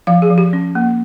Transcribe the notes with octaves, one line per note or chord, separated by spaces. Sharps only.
F3 F5
G#4
F3
G4
C#4
A#3